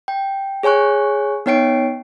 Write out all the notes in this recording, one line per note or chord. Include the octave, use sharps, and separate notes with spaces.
G5
G#4 C#5 G#5 C#6 F#6
B3 D#4 C#5 G5 C7 D7